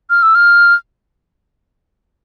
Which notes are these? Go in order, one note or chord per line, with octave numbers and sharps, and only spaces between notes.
F6
E6
F6